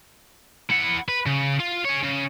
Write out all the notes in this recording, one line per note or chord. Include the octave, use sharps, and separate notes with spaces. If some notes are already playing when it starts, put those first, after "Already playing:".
E4 F#5
B4
C#3
F4
G#4 C#5
C#3